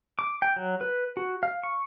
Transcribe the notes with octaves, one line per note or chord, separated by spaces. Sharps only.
D6
G5
F#3
B4
F#4
F5
C#6